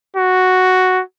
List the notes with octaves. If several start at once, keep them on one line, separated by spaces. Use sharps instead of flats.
F#4